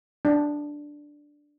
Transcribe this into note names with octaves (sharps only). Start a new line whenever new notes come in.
D4